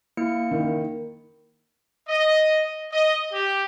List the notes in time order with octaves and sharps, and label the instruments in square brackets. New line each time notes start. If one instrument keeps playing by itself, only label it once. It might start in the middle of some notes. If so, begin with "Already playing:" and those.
[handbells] A#3 E4 C#7
[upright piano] D#3
[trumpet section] D#5
D#5
G4